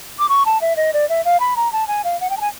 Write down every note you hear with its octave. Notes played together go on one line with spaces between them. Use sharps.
D6
C#6
A5
E5
D#5
D5
E5
F5
B5
A#5
A5
G#5
F5
F#5
G5
A5
G#5